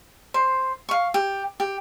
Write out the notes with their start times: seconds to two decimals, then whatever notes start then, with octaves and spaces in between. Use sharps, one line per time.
0.34 C5
0.89 F5 C#6
1.14 G4
1.60 G4